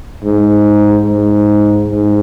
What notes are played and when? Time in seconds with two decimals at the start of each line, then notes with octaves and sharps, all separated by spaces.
0.24 G#2
1.06 G#2
1.89 G#2